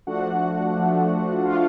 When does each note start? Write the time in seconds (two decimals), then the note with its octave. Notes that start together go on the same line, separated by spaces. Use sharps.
0.07 F3 A3 D4 F#4 F#5
0.76 F3 A3 D4
1.45 F3 A3 D4 F4 F5